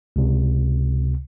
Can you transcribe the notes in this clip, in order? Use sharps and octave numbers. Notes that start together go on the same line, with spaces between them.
C#2 C3